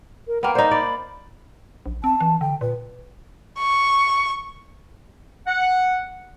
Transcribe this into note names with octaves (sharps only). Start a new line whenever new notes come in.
A#4
A#3 B3 G5
D#4 C5 D5
D5 B5
A#1
C4 A5
E3
D3 G5
A#2 B4
C#6
F#5